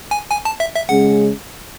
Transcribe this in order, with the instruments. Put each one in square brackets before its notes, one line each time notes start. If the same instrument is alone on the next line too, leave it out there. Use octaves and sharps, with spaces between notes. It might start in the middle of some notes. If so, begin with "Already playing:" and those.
[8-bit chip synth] G#5
G#5
A5
E5
E5
[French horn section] C#3 G#3 C#4 G#4 [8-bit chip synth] F#5